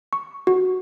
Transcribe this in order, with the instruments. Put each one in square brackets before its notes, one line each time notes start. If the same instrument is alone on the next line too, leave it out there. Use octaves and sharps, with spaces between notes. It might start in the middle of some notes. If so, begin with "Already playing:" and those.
[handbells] C#6
F#4